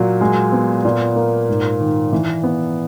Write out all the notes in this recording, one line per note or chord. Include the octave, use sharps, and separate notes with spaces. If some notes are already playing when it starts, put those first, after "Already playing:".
Already playing: A#2 F#3
G#3
B3
A#2
A#3
G#2
D#3
E3
B3